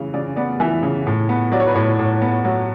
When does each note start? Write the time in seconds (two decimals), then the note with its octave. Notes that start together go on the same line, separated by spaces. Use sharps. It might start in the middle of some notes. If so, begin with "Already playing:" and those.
Already playing: C#3 E3
0.14 C#3 D5
0.36 B3 D5
0.60 E3 E5
0.83 C#3
1.07 A2
1.29 B3
1.52 F#3 D5
1.60 C#5
1.67 B4
1.74 A2 C#5
1.99 A2
2.22 B3
2.45 F#3